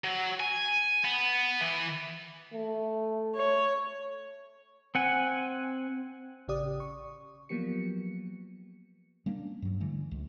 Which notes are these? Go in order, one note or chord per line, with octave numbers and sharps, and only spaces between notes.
F#3
G#5
B3
E3
A3
C#5
C4 F#5 G#5
A1 C#3 G4 D5 D#6
C#6
F3 F#3 A#3 B3 G4 C#7
G3 A#3 C#4 D4
G2 F#3
D3 E3 G3 A3
C#2